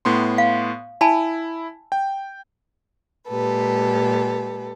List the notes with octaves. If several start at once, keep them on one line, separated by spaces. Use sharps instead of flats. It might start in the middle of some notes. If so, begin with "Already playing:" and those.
A2 B3 C6
F5
E4 G#5 A5 B5
G5
A#2 G#3 G4 A4 B4